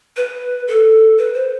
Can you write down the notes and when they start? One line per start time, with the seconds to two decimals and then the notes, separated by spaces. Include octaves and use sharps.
0.17 B4
0.68 A4
1.18 B4
1.34 C5